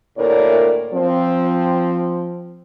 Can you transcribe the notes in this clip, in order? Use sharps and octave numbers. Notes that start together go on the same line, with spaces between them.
D2 A2 A#3 A#4 C#5 D5
F3 C4